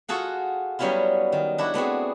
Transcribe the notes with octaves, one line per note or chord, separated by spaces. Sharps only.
F4 F#4 G#4 A4 F#5
F#3 G3 B3 C#4 E4 F4
D#3
D4 E4 F#4
A3 B3 C4 G#4